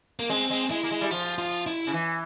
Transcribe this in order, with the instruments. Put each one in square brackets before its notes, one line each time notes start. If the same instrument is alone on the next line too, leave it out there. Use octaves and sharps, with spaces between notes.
[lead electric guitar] A#3
[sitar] G#3 [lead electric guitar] C4
[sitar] G#3
[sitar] G#3 [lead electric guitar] E4
[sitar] A#3
G#3
G3
[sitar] F3 [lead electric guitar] F4
[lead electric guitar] F4
E4
[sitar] C#3
E3